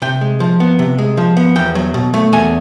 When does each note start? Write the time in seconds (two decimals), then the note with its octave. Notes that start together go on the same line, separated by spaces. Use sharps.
0.02 C3 G5
0.21 G#3
0.40 F3
0.60 B3
0.79 C3
0.98 G#3
1.17 F3
1.37 B3
1.56 E2 G5
1.75 F#3
1.94 B2
2.14 A3
2.33 E2 G#5